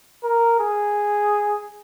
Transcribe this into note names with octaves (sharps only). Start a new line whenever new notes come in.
A#4
G#4